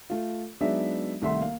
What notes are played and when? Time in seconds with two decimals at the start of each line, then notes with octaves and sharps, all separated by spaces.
0.10 A3 F4
0.61 F#3 G#3 B3 D4 D#4 E5
1.22 C2 D#3 A3 E5 F#5 C6
1.39 A#3 F5